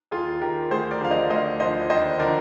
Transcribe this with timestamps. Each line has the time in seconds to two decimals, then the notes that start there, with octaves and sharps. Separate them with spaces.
0.11 D#2 F4 G#4
0.42 D#3 G4 A#4
0.71 D2 G#4 C5
0.91 A#4 D5
1.01 D3 F3 F5
1.11 C5 D#5
1.30 D2 C5 D#5
1.60 D3 F3 C5 D#5
1.90 D#2 C5 D#5
2.19 D3 F3 A#4 D5